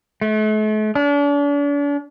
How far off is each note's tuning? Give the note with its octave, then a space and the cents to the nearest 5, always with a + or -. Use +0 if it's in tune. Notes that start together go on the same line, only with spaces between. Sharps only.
A3 -40
D4 -40